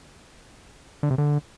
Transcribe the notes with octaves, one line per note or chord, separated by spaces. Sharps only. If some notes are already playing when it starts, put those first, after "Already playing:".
D3
C3
D3